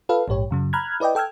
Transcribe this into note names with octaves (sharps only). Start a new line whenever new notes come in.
F4 A4 B4 F5
A#1 G#2 G4 C#5
F#2 C#3 F#3
A#5 B5 F6 F#6 G#6
E4 B4 D5 D#5 G5
A4 G5 E6 F6 G#6